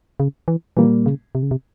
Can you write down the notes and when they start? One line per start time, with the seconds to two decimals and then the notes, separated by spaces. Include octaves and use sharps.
0.20 C#3
0.48 E3
0.77 A#2 E3 G3 A#3
1.06 C#3
1.35 C3
1.43 C#3
1.51 C3